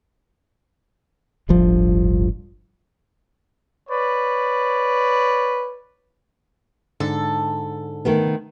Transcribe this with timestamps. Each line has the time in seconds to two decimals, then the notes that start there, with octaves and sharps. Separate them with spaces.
1.49 D1 G1 G2 F3
3.90 B4 C#5 D5
7.00 G#2 D3 A4
8.05 D#3 A3 B3